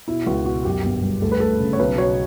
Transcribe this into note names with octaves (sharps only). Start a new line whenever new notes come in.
B2 E4
C#2 F#4
B2 F#4
F#2 G4
G1
G3
D2 A4
B4
D2 A4
C#3
C#5
B1 B4
B2 C#5